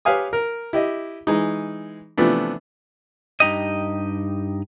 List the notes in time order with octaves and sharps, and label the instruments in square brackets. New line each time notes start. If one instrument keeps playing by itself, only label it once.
[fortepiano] G4 B4 C#5 F5 G#5 D#6
A#4
E4 G4 D#5
E3 G#3 D#4
C3 E3 F3 A3 B3 D4
[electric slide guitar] G2 D#4 G4 D#5